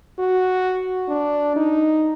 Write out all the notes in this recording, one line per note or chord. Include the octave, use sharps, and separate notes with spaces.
F#4
D4
D#4